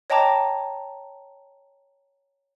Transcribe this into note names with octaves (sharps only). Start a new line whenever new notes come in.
C#5 D#5 G5 A5 A#5 D6